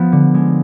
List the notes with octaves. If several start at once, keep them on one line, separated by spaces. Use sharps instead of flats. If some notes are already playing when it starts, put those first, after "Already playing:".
Already playing: F3 B3
D3
G#3